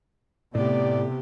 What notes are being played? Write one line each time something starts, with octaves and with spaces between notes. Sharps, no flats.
A2 C3 B3 G4 D5